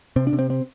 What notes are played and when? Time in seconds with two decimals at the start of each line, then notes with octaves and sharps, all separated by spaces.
0.16 C3 C4
0.27 D4
0.33 C3
0.39 C4
0.50 C4